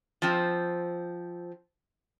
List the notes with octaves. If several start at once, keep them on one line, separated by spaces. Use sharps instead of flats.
F3 C4